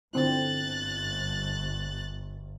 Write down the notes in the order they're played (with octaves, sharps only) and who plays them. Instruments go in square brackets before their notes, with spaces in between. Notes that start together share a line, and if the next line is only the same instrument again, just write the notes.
[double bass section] G1 G2 [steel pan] D3 C4 E4 [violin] F#6 A6